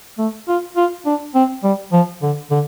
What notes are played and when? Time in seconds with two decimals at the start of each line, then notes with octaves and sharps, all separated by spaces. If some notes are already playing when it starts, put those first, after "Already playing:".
0.18 A3
0.48 F4
0.77 F4
1.06 D4
1.35 C4
1.64 G3
1.93 F3
2.22 D3
2.51 D3